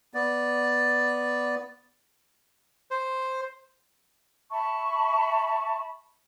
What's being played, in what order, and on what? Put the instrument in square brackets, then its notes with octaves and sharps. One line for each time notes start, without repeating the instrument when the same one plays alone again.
[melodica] B3 D5
[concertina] C5
[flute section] E5 A5 B5 C#6